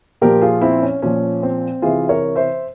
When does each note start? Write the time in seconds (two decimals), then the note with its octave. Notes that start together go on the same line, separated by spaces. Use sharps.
0.22 A#2 F3 G4 A#4
0.41 F4 G#4
0.61 C4 E4
0.82 C#4
1.02 A#2 F3 C#4
1.43 C4
1.82 C3 E3 F4 G#4
2.09 A#4 C#5
2.36 C5 E5